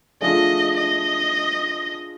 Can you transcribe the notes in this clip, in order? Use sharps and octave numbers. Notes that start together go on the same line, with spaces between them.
F3 A3 D4 F4 G#4 D#5
D#5